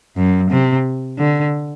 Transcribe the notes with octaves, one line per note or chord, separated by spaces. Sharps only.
F#2
C3
D3